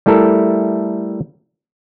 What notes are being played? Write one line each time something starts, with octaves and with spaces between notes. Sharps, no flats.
G3 A3 E4 A4 A#4